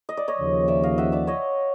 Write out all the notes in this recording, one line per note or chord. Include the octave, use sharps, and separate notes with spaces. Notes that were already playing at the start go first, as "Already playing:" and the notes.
D#5
D5
C#5 D#5
D#2 C#3 F3
D5 E5
D#5 F5
E5 F#5
D5 E5
C#5 D#5